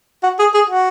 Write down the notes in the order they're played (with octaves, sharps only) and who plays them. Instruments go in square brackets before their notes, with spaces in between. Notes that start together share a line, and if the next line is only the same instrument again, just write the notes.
[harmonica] F#4
G#4
G#4
F#4